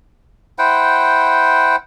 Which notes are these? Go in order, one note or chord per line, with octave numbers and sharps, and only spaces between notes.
E4 C5 F#5 G5